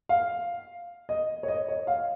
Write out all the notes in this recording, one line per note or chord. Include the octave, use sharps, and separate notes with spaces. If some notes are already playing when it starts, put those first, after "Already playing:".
F5
D#5
C#5
D#5
C#5
F5